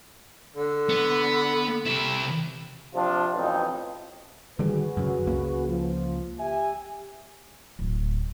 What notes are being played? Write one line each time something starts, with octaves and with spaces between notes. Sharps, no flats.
D3
B3
C3 E4
C3 F3 D4 F4
A1 F2 B2 D#4
D3 D#3 G3 F#4 G#4 B4
F#2 C#3
C#2 C#3 A#3
F3
G4 E5 G#5
D1